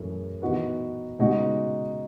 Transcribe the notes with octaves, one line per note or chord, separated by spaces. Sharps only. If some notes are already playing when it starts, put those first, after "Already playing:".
Already playing: F#2 E3 A3 G#4
E3 B3 D#4 F#4 B4
C#3 G#3 B3 D#4 F#4